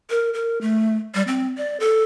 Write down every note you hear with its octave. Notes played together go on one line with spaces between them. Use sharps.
A#4
A#4
A3
G3
C4
D5
A4